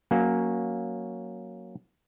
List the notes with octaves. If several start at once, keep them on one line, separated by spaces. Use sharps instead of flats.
F#3 A#3 C#4